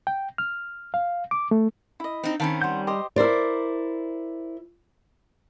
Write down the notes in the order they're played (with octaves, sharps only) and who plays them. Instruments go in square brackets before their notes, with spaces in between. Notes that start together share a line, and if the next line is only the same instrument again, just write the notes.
[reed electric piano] G5
F6
F5
D6
A3
[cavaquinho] E4 D#5
[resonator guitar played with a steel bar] C4 D#4
[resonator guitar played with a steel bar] D#3 C4 C#4 [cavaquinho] F5 A5 B5
[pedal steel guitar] G3 G6 [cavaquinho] C5 F#5
[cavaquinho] G4 C5 D#5
[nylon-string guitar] E4 A#4 C5 D5